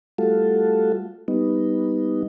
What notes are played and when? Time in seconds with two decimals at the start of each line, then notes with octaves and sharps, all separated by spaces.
0.18 G3 A3 F4 F#4 A4
1.28 G3 B3 D#4